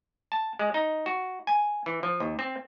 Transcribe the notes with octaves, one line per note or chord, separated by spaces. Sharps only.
A5
G#3
D#4
F#4
G#5
E3
F3
D#2
C4